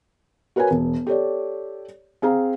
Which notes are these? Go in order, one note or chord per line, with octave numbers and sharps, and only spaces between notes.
F#4 A#4 B4 C#5 G#5
E1
G4 A4 C#5 D5
C4 G#4 F5 A#5